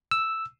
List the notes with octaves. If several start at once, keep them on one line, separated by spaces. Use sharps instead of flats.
E6